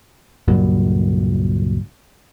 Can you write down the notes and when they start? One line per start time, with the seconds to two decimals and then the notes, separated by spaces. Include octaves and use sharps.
0.48 C#2 G2 A#2 F#3